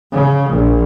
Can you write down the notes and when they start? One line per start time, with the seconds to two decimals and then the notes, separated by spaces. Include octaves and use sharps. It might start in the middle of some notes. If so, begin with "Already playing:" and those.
0.12 C#3
0.53 A#1